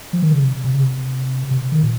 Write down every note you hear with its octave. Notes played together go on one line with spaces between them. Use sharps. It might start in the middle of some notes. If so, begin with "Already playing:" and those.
F3
D#3
C#3
C3
C3
C#3
C3
C3
D#3
A#2